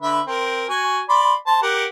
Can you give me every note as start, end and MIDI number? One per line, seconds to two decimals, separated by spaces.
0.02 0.21 50
0.02 0.21 71
0.02 0.21 76
0.27 0.66 60
0.27 0.66 70
0.69 1.00 66
0.69 1.00 80
1.09 1.34 74
1.09 1.34 83
1.09 1.34 84
1.47 1.61 72
1.47 1.61 81
1.62 1.85 67
1.62 1.85 70
1.62 1.85 78